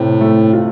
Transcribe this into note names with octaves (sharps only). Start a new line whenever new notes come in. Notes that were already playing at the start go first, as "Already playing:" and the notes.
Already playing: A2 C3 C4
A3
F4